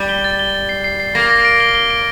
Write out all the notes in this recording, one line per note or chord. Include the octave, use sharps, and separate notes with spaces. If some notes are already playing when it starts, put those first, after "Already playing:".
Already playing: G3
G7
A6
G7
A6
C7
C7
C7
A#3 A#6
A#6
D7
G7
G7
D7